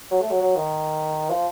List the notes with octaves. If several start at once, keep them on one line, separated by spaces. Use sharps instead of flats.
F#3
A3
F#3
F#3
D#3
F3